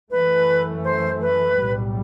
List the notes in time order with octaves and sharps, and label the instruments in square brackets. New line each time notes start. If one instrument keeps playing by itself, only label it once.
[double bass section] F#2 E3 A3 [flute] B4
[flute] C5
B4
[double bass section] B1 A2 G3